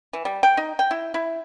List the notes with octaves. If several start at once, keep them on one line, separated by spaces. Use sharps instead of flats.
E3
G3
G5
D#4
G5
E4
E4